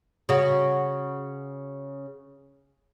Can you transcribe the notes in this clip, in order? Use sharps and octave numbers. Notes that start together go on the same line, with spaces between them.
C#3 F#4